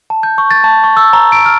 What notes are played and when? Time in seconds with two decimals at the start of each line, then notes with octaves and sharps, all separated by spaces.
0.10 A5
0.23 G6
0.38 C#6
0.51 A6
0.64 A5
0.84 C#6
0.97 E6
1.13 A#5
1.32 D7
1.46 F6